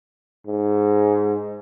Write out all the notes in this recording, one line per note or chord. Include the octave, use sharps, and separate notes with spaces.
G#2